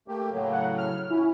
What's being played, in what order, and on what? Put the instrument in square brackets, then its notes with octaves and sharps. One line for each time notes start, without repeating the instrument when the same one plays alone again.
[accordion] A3 A#3 G4
A2 C#3 F#3
[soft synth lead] F#5
F6
[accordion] C#4 [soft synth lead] E4